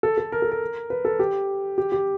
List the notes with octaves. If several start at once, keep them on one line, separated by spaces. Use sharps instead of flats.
A4
A4
A#4
A4
A#4
B4
A4
G4
G4
G4